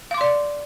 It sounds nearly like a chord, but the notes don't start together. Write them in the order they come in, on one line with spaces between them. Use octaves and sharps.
F5 D6 C6 D5